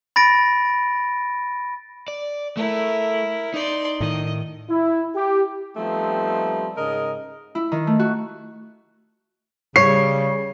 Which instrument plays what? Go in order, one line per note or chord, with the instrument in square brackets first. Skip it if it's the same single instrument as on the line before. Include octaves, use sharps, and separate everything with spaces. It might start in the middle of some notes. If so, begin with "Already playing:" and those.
[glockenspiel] B5 A6 A#6 D7
[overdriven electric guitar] D5
[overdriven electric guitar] A3 [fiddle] E4 A#4
[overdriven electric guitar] D#4 [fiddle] D5 C6
[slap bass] A2 D#3 [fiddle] D#5
[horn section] E4
G4
F3 G3 A3 B3 C4 D#4
G#2 C#3 A#4 D#5
[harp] E4
D#3
A3
F#4
[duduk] C#3 [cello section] G3 [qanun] C#5 [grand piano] C7